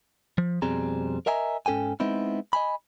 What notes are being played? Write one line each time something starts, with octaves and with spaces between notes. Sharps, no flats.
F3
F2 B2 G3 C4 G#4 A#5
A#4 D#5 E5 G#5 A#5
G#2 C#4 A4 G5 G#5
G#3 B3 C4 D#4 E4
D#5 G#5 B5